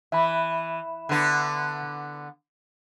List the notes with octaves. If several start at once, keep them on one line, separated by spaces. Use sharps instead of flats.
E3 E5 B5
D3 B3